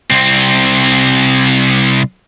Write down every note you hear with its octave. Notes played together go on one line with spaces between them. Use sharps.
C2 C4